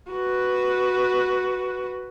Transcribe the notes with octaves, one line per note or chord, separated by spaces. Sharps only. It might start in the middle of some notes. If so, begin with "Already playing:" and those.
F#4 B4